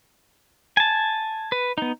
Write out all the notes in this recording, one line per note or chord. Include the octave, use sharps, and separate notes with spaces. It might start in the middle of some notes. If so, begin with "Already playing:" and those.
G#5 A5
B4
B3 D#4